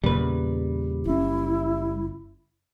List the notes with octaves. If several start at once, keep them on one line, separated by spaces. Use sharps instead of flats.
E2 A#2 C#3 G3 B4
F#1 C#4 E4